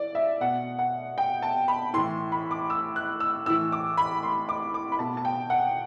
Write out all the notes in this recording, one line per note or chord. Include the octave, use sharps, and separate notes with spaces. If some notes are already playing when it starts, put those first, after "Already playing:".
Already playing: E3 D5
E5
B2 F#5
F#5
G5
A5
B5
A2 E3 C6
B5
D6
E6
F#6
E6
A2 E3 E6
D6
B5
C6
D6
D6
B5
B2 A5
A5
G5
F#5